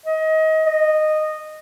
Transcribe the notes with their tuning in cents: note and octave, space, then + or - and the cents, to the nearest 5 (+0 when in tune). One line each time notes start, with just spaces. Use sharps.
D#5 +25
D#5 -10